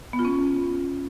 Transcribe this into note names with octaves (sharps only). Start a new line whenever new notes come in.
B3
F4
C#4